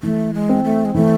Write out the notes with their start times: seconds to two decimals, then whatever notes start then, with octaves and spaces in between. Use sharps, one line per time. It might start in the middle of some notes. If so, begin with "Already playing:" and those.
0.03 E3 A3
0.34 G#3
0.49 C4
0.64 A3
0.85 G#3
0.95 E3 A3